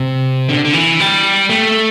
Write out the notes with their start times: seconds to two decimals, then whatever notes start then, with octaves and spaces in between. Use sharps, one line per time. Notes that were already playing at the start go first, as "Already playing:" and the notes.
Already playing: C3
0.49 D3
0.64 D3
0.73 E3
1.00 G3
1.50 A3